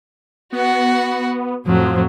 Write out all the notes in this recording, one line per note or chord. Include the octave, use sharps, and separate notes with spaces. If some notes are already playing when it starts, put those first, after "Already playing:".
B3 F#4 F#5
F2 A2 F3 F#3